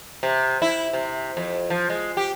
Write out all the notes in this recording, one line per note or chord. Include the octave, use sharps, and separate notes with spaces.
C3
E4
C3
F2
F3
G#3
G4